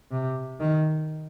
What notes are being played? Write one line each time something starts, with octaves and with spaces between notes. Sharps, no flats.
C3
D#3